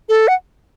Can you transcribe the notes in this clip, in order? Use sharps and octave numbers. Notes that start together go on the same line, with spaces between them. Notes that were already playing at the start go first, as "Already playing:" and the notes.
A4
F#5